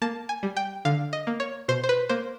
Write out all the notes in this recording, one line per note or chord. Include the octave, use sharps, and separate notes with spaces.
A#3 A5
G#5
G3
G5
D3 F5
D#5
A#3
C#5
B2 C5
C5
B4
A#3 C5